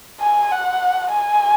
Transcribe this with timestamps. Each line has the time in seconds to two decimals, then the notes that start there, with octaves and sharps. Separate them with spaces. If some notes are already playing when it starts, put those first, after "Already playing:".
0.21 G#5
0.52 F#5
1.13 G#5